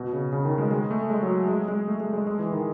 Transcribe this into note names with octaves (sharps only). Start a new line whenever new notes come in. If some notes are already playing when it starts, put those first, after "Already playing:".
Already playing: B2
C#3
C#3
D#3
G#3
G#3
A3
G#3
F#3
G#3
G#3
A3
G#3
G#3
G#3
E3
D#3